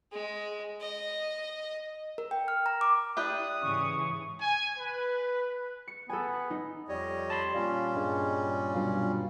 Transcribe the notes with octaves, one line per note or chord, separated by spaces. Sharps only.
G#3
D#5
A#4
G5
F6
A#5
D6
D4 E4 G4 D#6 F#6
G#2 C#3 E3 C#6
G#5
B4
C#7
B3 A4 G#5
D#4
F2 G3 C#5 D#5
A5 B5 C6
A#2 G3 C#4 F4
G2 G#3
G2 B2 F#3 F4